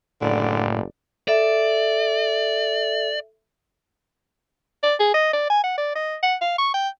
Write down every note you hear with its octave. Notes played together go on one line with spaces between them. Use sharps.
F#1 A2 D3 D5
A4 D5 E5
D5
G#4
D#5
D5
G#5
F#5
D5
D#5
F#5
F5
C#6
G5